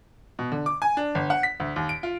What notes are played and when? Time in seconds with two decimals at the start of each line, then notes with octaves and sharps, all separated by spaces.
0.39 B2
0.52 D3
0.66 D6
0.82 G#5
0.97 D4
1.15 G1
1.30 F#5
1.43 B6
1.60 D2
1.76 D#2
1.89 D7
2.03 F4